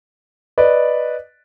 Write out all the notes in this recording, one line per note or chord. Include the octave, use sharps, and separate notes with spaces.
B4 D5 D#5